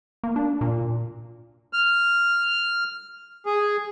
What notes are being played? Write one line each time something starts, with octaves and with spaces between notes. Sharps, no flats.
A#3
D4
A#2
F6
G#4